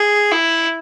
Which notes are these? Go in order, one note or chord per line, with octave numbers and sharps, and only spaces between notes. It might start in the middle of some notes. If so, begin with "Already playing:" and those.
Already playing: G#4
E4